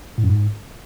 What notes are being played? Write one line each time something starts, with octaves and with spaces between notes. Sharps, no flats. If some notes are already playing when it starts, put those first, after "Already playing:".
A2
F#2
G#2